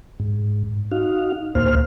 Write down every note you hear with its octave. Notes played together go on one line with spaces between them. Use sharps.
G#2
D#4 F#4 F5
D2 A2 A#3 C5 F6